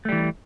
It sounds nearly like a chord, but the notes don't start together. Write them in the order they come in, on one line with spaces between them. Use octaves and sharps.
A3 G3 E3